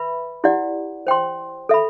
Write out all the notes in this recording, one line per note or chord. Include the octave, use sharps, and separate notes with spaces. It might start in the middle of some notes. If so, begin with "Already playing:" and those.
Already playing: B4 E5 B5
E4 G4 D5 F#5
C5 G5 C6
A4 E5 B5